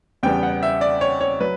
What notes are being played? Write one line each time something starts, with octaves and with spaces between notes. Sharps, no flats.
E2 C#3 G3 B3 G5
F#5
E5
D5
C#5
C#5
F#3 B4